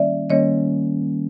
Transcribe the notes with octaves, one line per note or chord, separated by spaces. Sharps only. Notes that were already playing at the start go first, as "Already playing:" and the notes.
Already playing: D#3 G3 A#3 C#4 D5 E5
D#3 G3 A#3 C#4 C#5 D#5